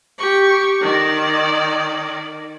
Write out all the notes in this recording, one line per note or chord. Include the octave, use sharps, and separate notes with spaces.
G4 C#6
D#3 D5